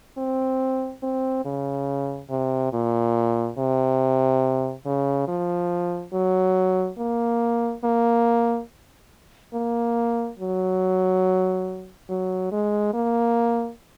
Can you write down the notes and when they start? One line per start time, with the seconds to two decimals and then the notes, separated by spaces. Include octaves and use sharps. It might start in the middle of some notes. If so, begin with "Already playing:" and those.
0.17 C4
1.03 C4
1.45 C#3
2.30 C3
2.73 A#2
3.58 C3
4.86 C#3
5.28 F3
6.13 F#3
6.98 A#3
7.84 A#3
9.54 A#3
10.39 F#3
12.09 F#3
12.52 G#3
12.94 A#3